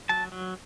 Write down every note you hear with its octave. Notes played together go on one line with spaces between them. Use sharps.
F#3 A5
F#3